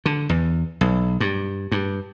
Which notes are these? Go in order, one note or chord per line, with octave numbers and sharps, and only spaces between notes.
D3
E2
B1
G2
G2